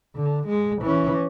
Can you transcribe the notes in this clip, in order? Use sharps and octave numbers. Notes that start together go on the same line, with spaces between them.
D3
G#3
E3 C#4